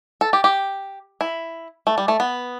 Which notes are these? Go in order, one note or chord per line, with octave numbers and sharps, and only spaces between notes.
A4
G4
G4
E4
A3
G3
A3
B3